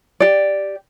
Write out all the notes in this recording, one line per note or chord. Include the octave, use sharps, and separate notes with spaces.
G4 D5